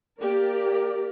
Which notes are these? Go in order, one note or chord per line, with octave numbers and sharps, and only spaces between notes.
A#3 G4 A#4 D5